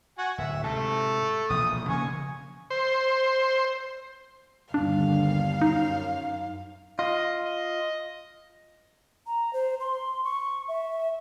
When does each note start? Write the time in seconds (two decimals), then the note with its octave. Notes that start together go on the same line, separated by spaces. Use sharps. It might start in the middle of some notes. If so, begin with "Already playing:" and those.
0.18 F#4 F#5 G#5
0.38 D1 E5
0.63 G#2 C3 A3 A4
1.50 E1 A#1 E2 D#6
1.89 C#3 F3 A#3 G#5 C#6
2.70 C5
4.74 G1 D#2 G3 D4 F5
5.61 F#2 D#4
6.99 F4 D#5
7.45 D#5
9.27 A#5
9.53 C5
9.80 C6
10.24 C#6
10.68 E5